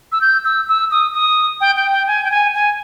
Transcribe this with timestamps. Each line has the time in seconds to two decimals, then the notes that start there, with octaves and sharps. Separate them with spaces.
0.12 E6
0.21 G6
0.45 E6
0.69 E6
0.91 D#6
1.14 D#6
1.61 G5
1.76 G5
1.92 G5
2.07 G#5
2.24 G5
2.31 G#5
2.54 G#5